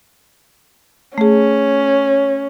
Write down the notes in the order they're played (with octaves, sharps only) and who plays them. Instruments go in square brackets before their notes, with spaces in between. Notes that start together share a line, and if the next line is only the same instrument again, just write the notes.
[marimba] A3 G#4 [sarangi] C#4